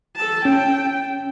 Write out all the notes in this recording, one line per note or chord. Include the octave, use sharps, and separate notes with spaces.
A4 A5
C#4 G5